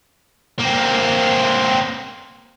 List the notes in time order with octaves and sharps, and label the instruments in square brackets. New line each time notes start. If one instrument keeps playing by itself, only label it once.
[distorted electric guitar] A#3 C4